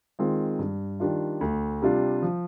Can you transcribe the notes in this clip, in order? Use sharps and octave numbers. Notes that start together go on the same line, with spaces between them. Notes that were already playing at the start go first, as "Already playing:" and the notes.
D#3 G#3 C4 F4
G2
D#3 G3 D4 F4
D2
C3 G3 D4 F4
F3